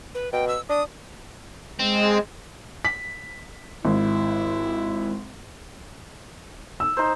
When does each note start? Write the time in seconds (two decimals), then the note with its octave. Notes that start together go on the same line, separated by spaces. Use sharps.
0.15 B4
0.33 B2 G5
0.48 E6
0.69 D4 D#6
1.79 G#3 C4
2.85 B6
3.85 G#1 E4
6.80 E6
6.97 D#4 C5